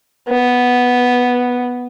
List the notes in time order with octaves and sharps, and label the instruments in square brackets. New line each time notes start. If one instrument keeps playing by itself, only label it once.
[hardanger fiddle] B3